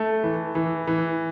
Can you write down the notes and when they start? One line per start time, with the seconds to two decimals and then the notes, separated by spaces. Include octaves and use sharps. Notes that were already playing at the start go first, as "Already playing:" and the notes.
Already playing: A3
0.24 E3
0.55 E3
0.87 E3